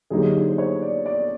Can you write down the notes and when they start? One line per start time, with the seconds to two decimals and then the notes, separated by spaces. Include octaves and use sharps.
0.10 D3 F#3 A#3 D#4 G4 G#4
0.48 C5
0.58 C#5
0.82 D5
1.06 D5